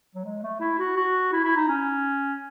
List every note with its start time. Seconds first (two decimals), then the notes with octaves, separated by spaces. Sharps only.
0.15 F#3
0.25 G#3
0.43 A3
0.60 E4
0.79 F#4
0.97 F#4
1.33 E4
1.44 E4
1.57 D#4
1.69 C#4